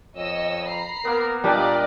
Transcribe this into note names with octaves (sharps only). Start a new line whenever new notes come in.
F2 C#5 D#5 E6
A#5 B5 C7
A#3 B3 A#4
A#2 G3 D4 G4 A#4 D5 D#5 F#5